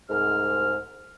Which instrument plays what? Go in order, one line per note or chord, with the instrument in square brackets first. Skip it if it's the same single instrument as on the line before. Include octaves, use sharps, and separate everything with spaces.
[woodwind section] C2 G#2 F6